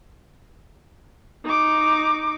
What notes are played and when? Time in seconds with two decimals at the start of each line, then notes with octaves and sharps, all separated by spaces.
1.45 D#4 D6